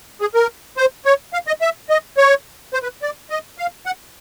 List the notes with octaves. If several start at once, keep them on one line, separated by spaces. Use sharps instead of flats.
G#4
A#4
C5
C#5
F5
D#5
E5
D#5
C#5
C5
B4
D5
D#5
F5
F#5